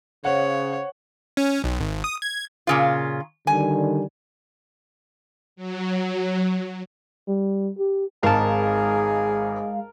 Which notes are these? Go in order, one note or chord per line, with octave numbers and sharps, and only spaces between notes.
C#3 C5 C#5 F5 F#5
C#4
B1
G#1
D#6
G#6
A#2 C#3 F4
D3 D#3 G3 G#5
F#3
G3
G4
G#1 G#2 G#3 G#4 A#4 F5 A5